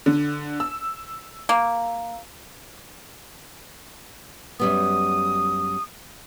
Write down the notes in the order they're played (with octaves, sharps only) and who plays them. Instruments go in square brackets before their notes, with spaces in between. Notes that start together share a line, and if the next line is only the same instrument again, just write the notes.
[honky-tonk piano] D3
E6
[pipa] A#3
[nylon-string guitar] F#2 G3 B3 [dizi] D#6